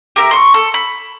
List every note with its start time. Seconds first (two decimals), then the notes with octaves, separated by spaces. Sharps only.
0.16 G4 A#4 E5
0.31 C6 C#6
0.54 A4
0.74 B5